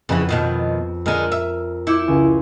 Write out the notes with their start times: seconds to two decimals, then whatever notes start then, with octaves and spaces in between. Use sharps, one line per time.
0.09 F2 C#3 E3 B4 F#5
0.29 B2 D#3 F3
1.06 D3 G#3 A#4 F6 D#7
1.32 E5
1.87 E4 D6 G6 C#7
2.08 C#2